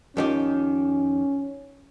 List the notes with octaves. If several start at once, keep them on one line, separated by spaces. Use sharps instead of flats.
F2 D#3 C#4 G4